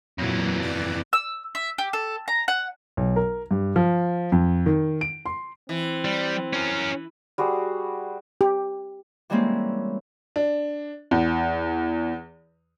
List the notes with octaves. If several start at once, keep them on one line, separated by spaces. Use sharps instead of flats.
F2 A#2 E3 F#3
D5
E6
E5
G4
A4
A#5
F#5
B1
A#4
G2
F3
F2
D#3
D7
C6
E3 C4
G3
C#4 A#4
G3 F#4 G#4 C5
G4
E3 G3 G#3 A#3 C4 C#4
D4
E2